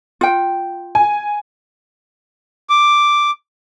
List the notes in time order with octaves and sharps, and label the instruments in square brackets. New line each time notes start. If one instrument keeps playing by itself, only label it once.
[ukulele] F4 G5
[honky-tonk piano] G#5
[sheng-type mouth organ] D6